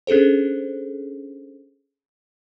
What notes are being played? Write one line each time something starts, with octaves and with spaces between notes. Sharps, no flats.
C#4 D4 G#4 A4 C5